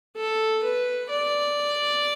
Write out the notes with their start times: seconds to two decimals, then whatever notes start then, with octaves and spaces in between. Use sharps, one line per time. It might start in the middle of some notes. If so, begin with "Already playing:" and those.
0.17 A4
0.63 B4
1.10 D5